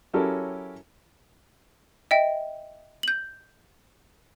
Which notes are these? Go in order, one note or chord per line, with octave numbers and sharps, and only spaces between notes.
F#3 C#4 E4 G4 A4 A#4
D#5 E5 G5
G6 F#7